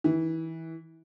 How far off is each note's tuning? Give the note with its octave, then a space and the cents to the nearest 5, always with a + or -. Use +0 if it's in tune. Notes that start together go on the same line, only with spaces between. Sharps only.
E3 -25